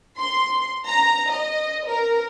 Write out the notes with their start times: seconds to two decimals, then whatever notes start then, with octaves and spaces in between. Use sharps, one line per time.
0.17 C6
0.87 A#5
1.32 D#5
1.87 A#4